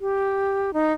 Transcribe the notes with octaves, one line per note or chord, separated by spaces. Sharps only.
G4
D#4